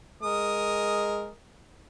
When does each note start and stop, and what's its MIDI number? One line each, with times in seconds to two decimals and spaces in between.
0.23 1.29 56
0.23 1.34 70
0.23 1.34 87